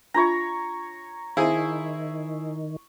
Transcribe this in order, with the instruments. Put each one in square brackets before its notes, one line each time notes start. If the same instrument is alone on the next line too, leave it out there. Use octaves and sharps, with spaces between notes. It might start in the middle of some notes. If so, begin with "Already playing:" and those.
[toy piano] D4 F4 E5 [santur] C#5 A#5
[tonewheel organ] D#3 [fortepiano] E4 G#4 C5 [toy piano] F5 A5